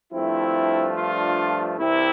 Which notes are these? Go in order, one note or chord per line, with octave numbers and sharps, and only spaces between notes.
G2 F3 A3 C4 E4
D4 F4
C2 C3 E3 C4 E4